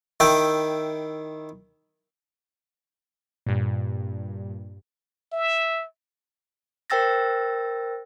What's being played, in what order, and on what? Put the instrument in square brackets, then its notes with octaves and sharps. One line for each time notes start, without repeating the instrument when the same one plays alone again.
[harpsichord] D#3 E4 G5
[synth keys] G2 A#2
[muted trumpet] E5
[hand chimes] A#4 C5 G5 E6 A6 A#6